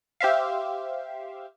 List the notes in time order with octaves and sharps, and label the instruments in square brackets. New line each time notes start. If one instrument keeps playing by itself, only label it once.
[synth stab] G4 C5 E5 F5